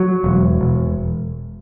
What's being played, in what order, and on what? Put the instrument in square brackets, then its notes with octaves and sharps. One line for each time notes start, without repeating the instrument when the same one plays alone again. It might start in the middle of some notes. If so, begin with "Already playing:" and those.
Already playing: [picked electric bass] F#3
E1
E1